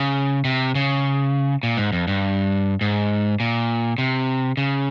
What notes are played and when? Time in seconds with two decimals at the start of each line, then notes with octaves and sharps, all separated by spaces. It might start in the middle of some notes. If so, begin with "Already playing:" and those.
Already playing: C#3
0.45 C3
0.75 C#3
1.63 A#2
1.77 G#2
1.92 F2
2.08 G2
2.81 G#2
3.40 A#2
3.98 C3
4.57 C#3